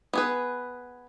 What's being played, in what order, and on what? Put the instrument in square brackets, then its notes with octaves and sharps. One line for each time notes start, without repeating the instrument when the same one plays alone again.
[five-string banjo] B3 G#4 B4